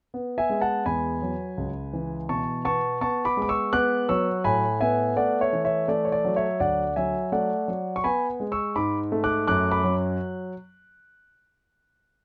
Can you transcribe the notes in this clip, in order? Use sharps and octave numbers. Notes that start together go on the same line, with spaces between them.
B3
E5 G#5
G#3
F#5 A5
E2 G#5 B5
F#3
C#2
E3
B2 A5 C#6
B3 A5 C#6
B3 A5 C#6
B5 D6
G#3
D6
C#6 E6
B3 D6 F#6
F#3 C#6 E6
A2 G#5 B5
B3 E5 G#5
A3 D5 F#5
C#5 E5
E3
C#5 E5
A3 D5
C#5
D5
F#3
C#5 E5
D2 D5 F#5
F#3 E5 G#5
A3 D5 F#5
F#3
C#6
B3 G#5 B5
G#3
C#6 E6
G#2 B5 D6
A3
D6 F#6
F#2 D6 F#6
B5 D6
F#3